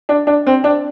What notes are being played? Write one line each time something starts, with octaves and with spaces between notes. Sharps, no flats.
D4
D4
C4
D4